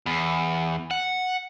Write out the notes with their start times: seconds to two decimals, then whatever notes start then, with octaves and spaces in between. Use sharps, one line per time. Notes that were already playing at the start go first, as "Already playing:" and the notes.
0.06 E2
0.91 F#5